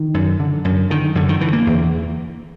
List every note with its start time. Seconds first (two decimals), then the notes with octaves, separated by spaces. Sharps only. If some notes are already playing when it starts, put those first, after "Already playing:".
Already playing: D#3
0.14 F#2
0.40 D3
0.65 F#2
0.90 D3 D#3
1.15 F#2 D3
1.29 D#3
1.40 D3 E3
1.53 A#3
1.67 E2